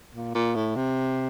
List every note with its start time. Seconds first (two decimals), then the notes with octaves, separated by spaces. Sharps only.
0.14 A#2
0.35 A#2
0.55 A2
0.76 C3